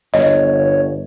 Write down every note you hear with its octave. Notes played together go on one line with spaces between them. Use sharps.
G1 C#5 D#5